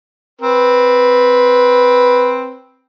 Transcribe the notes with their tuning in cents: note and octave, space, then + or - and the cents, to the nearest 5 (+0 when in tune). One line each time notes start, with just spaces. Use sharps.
C4 +0 B4 -5